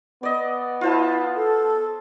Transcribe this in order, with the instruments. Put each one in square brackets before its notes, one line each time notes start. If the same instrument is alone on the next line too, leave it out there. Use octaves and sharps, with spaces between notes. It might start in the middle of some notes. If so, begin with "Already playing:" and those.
[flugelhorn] B3 [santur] D5 D#5
[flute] E4 [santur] F4 C5 A5
[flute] A4